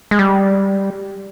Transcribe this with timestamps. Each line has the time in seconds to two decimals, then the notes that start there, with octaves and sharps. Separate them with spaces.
0.11 G#3
0.19 G3